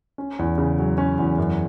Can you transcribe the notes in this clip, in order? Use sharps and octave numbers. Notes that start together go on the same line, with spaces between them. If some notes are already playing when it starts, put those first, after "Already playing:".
C#4
E2
C#3
F#3
C#4
E2
F#2